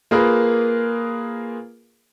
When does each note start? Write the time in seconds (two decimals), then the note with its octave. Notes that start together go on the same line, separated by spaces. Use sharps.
0.11 A#3 F4 G#4 A#4 B4 F5